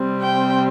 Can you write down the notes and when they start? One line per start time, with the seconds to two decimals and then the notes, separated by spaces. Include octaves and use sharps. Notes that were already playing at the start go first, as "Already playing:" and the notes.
Already playing: C3 G3 C4
0.20 G5